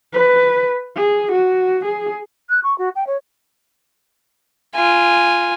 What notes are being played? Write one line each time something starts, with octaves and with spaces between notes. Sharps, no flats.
B4
G#4
F#4
G#4
F#6
C#6
F#4
G5
C#5
F4 G#5